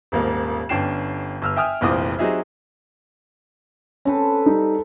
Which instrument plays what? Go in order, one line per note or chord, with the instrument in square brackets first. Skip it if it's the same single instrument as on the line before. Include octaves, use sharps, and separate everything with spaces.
[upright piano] D#1 G#1 A#3
G1 C#4 D4 G5 C7 E7
G1 E6 F6
E5 G5 G#5 D#6 F6
F1 A#1 E3 C4 D6 D#6
F#3 C4 D#4 G4 G#4 E5
[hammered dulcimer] C4 A4 B4 [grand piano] C#4
[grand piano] G3 D#4